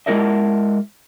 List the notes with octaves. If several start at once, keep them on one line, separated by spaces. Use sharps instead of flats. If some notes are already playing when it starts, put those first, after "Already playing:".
G#3 C4 E4 A#4 D#5 E5